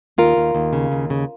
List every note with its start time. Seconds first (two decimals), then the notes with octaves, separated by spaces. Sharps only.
0.18 D#2 F4 A#4
0.37 D#2
0.55 D#2
0.73 C#3
0.92 D#2
1.10 C#3